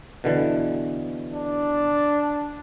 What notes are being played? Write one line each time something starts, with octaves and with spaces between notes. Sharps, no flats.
B2 D3 E3
D4